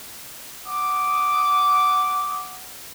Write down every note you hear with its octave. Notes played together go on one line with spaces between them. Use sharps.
F#5 D6 D#6